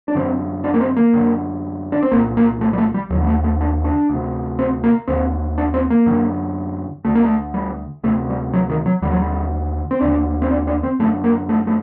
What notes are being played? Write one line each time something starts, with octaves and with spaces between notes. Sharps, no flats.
D4
F#2 D3 C4
D4
A#3
C4
A#3
F#2 D3
D4
C4
C2 A#2 A#3
A#3
A3
G3
A3
G3
D#2 D3 F#3
G3
A3
A3
D4
D4
D2 C3
C4
A#3
D#2 D3 C4
D4
C4
A#3
F#2 D3
D2 D3 A3
A#3
A3
G3
D2 C3 A3
G3
F#3
D#3
F#3
D#2 D3 G3
F#3
G3
C4
D#2 D3 D4
C4
D4
D4
C4
F#2 D3 A3
A#3
A3
A3